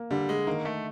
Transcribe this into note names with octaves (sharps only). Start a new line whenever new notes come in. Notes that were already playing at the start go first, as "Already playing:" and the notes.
Already playing: A#3
D3 G3
G#3
D#3 A#3
A3